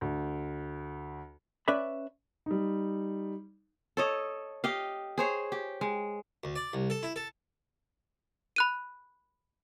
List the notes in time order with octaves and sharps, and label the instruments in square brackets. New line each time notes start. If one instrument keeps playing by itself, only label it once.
[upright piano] D2
[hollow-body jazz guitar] C#4 B4 D5 E5 B5
[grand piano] G3 D#4
[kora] A4 C#5 D#5
G4 D#5 F5
G#4 C5 C#5
G4
G#3
[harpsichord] D2
D5
C2
A4
E4
A4
[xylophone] B5 F#6 D#7